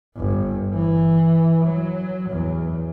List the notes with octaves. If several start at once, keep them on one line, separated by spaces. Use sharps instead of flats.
G1
E3
F#3
E2